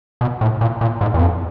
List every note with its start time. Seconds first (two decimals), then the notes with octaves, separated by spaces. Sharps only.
0.21 B2
0.41 A2
0.61 A#2
0.81 A#2
1.01 G#2
1.14 E2
1.21 F2